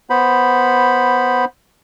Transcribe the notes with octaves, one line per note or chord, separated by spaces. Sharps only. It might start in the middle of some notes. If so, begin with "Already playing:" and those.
B3 C5 B5